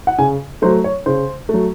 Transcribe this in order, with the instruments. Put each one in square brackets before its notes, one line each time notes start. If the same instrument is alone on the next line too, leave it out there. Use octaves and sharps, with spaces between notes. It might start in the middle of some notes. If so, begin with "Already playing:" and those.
[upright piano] F#5
C#3 G#5
F#3 A3 C5
C#5
C#3 C5
F#3 A3